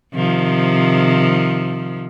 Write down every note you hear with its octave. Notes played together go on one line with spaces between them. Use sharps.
C3 D#3 F3